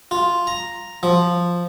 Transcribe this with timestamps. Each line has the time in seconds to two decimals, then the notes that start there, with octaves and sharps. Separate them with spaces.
0.11 F4
0.47 A#5
1.03 F3